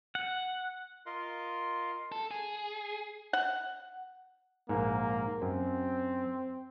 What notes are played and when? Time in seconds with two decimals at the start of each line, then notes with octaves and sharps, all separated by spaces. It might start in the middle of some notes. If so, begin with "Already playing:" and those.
0.15 F#5
1.06 F4 A#4 D#5 F5 C6
2.12 A4
2.31 G#4
3.33 F#5
4.69 A#1 G#2 A#3
5.42 F#2 C4